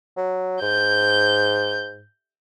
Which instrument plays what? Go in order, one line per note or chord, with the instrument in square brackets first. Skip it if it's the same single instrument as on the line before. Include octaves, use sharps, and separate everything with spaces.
[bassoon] F#3
[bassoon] G#2 [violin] G6